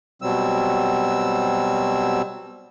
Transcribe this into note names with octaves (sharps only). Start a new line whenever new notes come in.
B2 F#3 G3 C4 E6